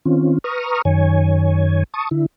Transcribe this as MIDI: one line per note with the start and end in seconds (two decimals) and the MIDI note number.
0.05 0.38 51
0.05 0.38 60
0.05 0.38 61
0.05 0.38 65
0.44 0.82 71
0.44 0.82 82
0.44 0.82 85
0.44 0.82 87
0.44 0.82 89
0.85 1.83 42
0.85 1.83 51
0.85 1.83 73
0.85 1.83 80
1.94 2.09 81
1.94 2.09 85
1.94 2.09 87
2.11 2.26 50
2.11 2.26 64